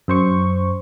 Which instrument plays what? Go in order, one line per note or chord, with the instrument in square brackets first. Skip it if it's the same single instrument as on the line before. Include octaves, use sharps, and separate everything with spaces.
[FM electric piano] F#2 C5 C#6